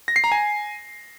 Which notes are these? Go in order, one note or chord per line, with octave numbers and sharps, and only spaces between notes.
A#6
C7
A#5
G#5